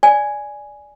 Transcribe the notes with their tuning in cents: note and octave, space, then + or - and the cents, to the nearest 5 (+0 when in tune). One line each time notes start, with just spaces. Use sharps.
D5 +0 G#5 +0